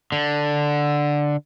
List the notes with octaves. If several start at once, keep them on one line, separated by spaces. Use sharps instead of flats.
D3